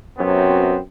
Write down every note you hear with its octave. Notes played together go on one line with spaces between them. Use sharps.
F#2 C3 F#3 B3 C4